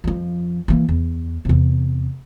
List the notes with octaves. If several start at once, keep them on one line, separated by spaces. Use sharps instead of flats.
F2 F3
E3 A#3
E2
E2 C3